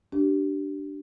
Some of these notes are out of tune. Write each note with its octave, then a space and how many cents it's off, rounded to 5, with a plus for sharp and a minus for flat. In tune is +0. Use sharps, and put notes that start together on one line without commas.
D4 +0 G4 -30